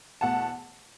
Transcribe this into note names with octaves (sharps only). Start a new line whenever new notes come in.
E2 B2 A3 F#5 A5